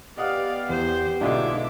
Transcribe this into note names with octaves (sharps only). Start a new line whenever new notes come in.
B3 G4 D5 D#5 F5 F#5 D#6
E2 C5
B1 G#2 D3 D4 F4 D#5 E5 D6